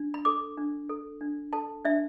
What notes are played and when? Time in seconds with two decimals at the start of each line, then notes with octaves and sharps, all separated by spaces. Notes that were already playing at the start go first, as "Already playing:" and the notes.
Already playing: D4
0.14 B5
0.25 A4 D6
0.58 D4
0.89 A4
1.21 D4
1.53 A4 A5
1.85 D4 E5